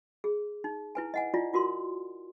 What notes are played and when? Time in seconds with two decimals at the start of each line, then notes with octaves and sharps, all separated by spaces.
0.24 G#4
0.64 D#4
0.95 E4 B4 G#5
1.14 D#5 F#5 G#5
1.34 E4 F4 D5
1.53 F4 F#4 A#4 C6